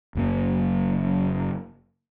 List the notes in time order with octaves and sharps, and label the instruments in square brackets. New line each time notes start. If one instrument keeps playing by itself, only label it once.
[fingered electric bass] F#1 F#2 A#3